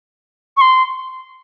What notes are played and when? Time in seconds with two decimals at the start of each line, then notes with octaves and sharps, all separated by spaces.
0.57 C#6
0.61 C6